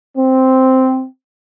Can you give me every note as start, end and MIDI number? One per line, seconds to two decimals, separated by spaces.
0.17 1.04 60